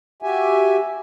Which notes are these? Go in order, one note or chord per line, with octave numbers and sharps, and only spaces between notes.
F#4 G4 E5 G#5